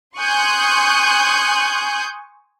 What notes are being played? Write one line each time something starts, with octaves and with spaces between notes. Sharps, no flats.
G#5 C6 C#6 D#6 F#6 G6